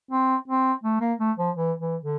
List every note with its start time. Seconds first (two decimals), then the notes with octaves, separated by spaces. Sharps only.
0.11 C4
0.48 C4
0.84 A3
1.01 A#3
1.19 A3
1.38 F3
1.56 E3
1.80 E3
2.03 D3